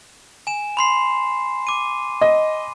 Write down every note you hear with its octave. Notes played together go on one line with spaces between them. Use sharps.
G#5 E7
B5 C6 C7
D6 D#7
D#5